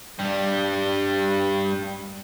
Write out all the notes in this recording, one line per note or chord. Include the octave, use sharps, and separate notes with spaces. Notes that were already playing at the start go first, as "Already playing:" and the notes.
G2 G3